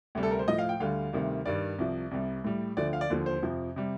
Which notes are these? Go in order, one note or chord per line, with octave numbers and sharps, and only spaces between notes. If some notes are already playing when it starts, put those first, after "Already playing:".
D2 C3 G3
A4
A#4
C5
A2 F3 D#5
F5
G5
D2 D3 G3 F5
D2 C3 D#3 G3
G2 D#3 G3 D5
C2 C3 F3
C2 C3 G3
A2 G3
D2 D3 F3 D5
F5
D5
D#2 D3 F3
C5
F2 C3 F3
C3 G3